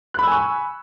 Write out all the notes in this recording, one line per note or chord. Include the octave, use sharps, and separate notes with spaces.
G#5 B5 C#6 E6 F#6